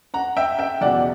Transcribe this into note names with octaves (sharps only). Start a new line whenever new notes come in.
F#5 A#5
E5 G5
E5 G5
E2 B2 D5 F#5